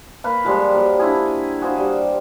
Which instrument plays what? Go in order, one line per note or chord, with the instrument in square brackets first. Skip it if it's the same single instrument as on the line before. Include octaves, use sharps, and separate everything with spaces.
[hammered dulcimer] A#3 B4 F5
F3 G3 G#3 F4
F#3 A#3
D4 E4 F4 G#4
F#4 G#4 C5 F5
G3